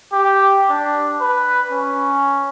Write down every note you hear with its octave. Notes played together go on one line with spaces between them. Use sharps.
G4
D4
B4
C#4